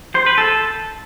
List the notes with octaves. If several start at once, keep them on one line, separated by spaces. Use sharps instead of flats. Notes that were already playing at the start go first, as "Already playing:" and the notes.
C5
B4
A4